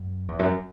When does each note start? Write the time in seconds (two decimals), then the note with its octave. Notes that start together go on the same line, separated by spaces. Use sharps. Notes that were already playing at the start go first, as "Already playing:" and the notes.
Already playing: F#2
0.28 E2
0.39 F#2